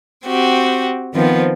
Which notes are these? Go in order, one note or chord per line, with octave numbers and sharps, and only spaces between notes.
C4 F#4 G4
D#3 F3 B3 C4